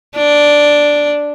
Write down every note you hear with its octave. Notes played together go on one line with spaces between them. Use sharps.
D4